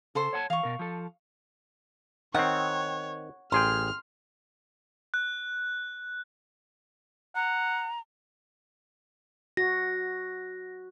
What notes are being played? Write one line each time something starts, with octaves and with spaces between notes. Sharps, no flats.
C#3 A4 C5 C6
C#5 F#5 A5
E3 F5 C#6
B2 A#4
F3 A4
D#3 C4 C#5 F#5
A1 G#4 G5 C6 F6
F#6
F#5 A#5
F#4 A#6